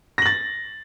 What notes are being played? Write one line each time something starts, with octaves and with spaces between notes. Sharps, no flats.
A6 A#6 F#7